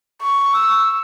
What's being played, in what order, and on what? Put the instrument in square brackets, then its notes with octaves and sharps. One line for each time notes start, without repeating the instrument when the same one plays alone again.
[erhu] C#6
[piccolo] E6